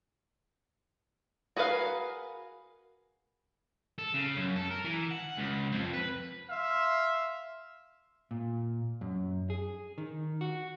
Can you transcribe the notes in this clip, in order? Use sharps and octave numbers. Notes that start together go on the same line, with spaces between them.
F#4 G#4 A#4 B4 F5
A4
C#3
F#2
A4
A#4
E3
F#5
C#2
F2
B4
E5 F5 C6
A#2
F#2
G#4
D#3
F#4